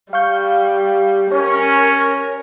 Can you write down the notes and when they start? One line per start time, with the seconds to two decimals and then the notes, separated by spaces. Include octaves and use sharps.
0.13 G3 F5 C#6 G6
1.32 C#4 A#4 C#5